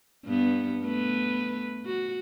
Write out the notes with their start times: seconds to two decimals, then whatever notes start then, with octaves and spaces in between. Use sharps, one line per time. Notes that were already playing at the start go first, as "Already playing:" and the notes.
0.24 G2 B3
0.82 A3 B3 B4
1.85 F#4